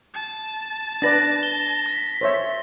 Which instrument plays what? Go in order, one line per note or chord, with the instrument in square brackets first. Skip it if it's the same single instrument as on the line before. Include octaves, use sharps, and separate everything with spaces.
[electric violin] A5
[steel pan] D4 B4 D5 [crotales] A6 A#6
[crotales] G7
[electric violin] B6
[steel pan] C5 C#5 E5